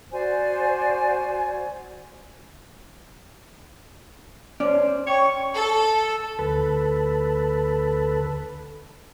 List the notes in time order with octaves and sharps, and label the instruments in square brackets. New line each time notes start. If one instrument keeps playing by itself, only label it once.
[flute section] F#4 C5 D5 G#5
[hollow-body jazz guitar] C#4 D5 [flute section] C5
[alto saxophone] C#5 [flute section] G5 C#6
[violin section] A4
[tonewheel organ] D2 A4 B4